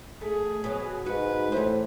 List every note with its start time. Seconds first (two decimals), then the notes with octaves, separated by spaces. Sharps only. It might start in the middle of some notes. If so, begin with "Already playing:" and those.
0.21 A3 G#4
0.64 B2 F#3
1.06 G#2 F#4 B4
1.52 A2 E3 C5